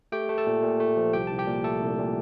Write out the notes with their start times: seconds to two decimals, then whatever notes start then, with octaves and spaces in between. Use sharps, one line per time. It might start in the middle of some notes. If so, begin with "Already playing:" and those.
0.12 A3 G4 G5
0.29 A3
0.38 A4 A5
0.47 A#2
0.63 A#2
0.80 A3
0.97 F3
1.13 C2 G4 G5
1.27 C2 A5
1.39 G4 G5
1.47 A#2
1.64 A3 A4 A5
1.81 C2
1.98 A#2